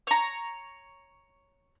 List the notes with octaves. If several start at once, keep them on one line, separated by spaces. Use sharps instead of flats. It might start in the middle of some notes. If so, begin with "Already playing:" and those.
C#5 A#5